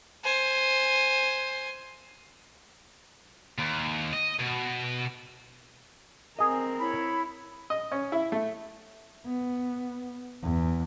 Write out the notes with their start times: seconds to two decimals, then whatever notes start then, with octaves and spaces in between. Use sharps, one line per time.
0.24 C5 G#5
3.58 D#2
4.13 D#5
4.40 B2
6.39 C4 G#4 A#4 D#5
6.79 E4 C#5 B5
7.70 D#5
7.92 C#4
8.12 E4
8.32 A3
9.26 B3
10.42 E2